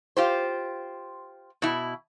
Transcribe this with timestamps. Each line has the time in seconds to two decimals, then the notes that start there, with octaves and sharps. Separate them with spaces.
0.17 F4 G4 C5
1.62 B2 E4